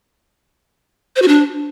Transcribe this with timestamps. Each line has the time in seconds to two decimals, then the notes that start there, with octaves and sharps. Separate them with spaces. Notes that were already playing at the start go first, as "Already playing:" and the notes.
1.16 C5
1.22 F#4
1.28 D4